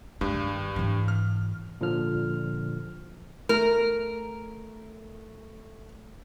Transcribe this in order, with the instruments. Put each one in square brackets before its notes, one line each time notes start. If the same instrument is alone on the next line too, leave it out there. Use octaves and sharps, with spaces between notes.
[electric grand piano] G2 [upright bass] G#3
[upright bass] D#3
G#2 E3
[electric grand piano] F6
[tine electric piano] A#2 D3 F3 F6
[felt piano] A3 [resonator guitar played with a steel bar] A#4